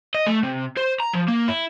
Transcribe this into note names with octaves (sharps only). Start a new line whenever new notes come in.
D#5
A3
C3
C5
A#5
F3
A#3
E4